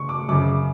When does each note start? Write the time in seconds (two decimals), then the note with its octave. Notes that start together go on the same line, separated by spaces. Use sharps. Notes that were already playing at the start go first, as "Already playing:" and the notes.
Already playing: C#3 C#6
0.09 D6
0.29 F#2 C#3 D6